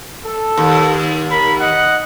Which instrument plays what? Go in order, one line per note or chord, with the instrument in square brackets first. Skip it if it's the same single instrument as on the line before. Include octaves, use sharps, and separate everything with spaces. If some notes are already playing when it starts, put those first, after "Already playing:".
[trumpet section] A4
[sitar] D#2
[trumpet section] A#4 B5
D#5 F#5